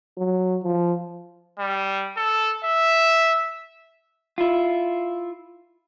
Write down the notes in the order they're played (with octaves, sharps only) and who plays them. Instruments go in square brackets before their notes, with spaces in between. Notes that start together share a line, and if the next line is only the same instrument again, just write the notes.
[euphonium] F#3
F3
[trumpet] G3
A4
E5
[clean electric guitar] E4 F4